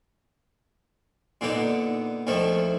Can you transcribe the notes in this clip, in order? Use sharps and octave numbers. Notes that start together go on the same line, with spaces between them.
A#2 D3 B3 D#4
D2 D#3 F3 A3